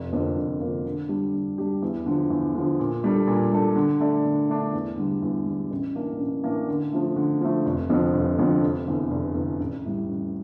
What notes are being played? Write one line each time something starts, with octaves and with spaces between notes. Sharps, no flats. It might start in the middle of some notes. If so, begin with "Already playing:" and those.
Already playing: F1
F2 D3 F3 A#3
F1
F2 D3 F3 A#3
D3
G3 D4 G4
D3
G3 D4 G4
E2
D3 F3
E2
D3 F3
A#2
G3 D4 A4
A#2
G3 D4 A4
D3
A3 D4 A4 D5
D3
A3 D4 A4 D5
E2
D3 G3
E2
D3 G3
A1
A2 E3 A#3 D4
A1
A2 E3 A#3 D4
D3
F3 A3
D3
F3 A3
F1
F2 D3 F3
F1
F2 D3 F3
F1
E2 D3
F1
E2 D3
A1
A2 G3
A1